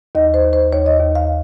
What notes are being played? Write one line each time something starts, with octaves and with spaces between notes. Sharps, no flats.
D#2 D#5
C5
D#2
C5
D#2 C#5
D#5
D#2
F5